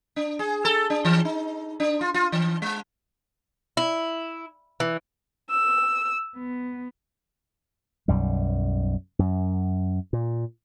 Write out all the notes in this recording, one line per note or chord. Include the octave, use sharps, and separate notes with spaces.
D4
G#4
A4
D4
E3
D#4
D4
F4
F4
E3
G#3
E4
E3
E6
B3
B1 F#2 G3
F#2
A#2